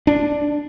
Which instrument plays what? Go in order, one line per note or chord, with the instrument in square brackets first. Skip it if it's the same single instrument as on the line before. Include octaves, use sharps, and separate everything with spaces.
[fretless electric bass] D4